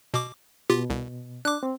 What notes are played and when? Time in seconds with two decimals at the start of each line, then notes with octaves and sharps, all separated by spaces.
0.14 B2 D6
0.70 B2 F4 G4
0.90 C2
1.45 D4 D6 F#6
1.63 C4